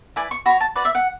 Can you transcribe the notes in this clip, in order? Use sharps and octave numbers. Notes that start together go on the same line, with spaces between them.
E4 B4 D5 G#5
C#6
F#4 C#5 B5
A5
F#4 B4 D5
E5
F#5